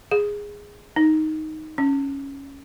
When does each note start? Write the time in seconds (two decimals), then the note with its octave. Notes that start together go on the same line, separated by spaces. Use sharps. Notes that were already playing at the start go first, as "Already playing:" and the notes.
0.11 G#4
0.96 D#4
1.78 C#4